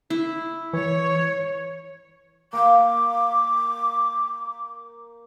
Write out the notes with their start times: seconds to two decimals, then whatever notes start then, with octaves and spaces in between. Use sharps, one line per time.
0.10 E4
0.73 E3 C#5
2.53 A#3 D6